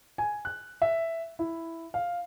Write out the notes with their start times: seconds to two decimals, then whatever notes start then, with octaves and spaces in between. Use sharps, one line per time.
0.18 G#5
0.45 F#6
0.82 E5
1.39 E4
1.94 F5